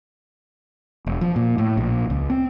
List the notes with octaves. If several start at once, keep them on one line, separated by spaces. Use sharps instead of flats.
E1
F3
A#2
A2
A#1
C#2
C4